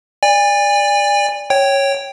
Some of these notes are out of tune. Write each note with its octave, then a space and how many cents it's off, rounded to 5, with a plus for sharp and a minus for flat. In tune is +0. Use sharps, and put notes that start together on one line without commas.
D5 +0 G#5 -35
C#5 -5 G5 +0